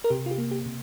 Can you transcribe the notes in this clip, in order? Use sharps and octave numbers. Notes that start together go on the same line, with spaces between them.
A#4
C3 G4
F4
G4
A#3
G4
C3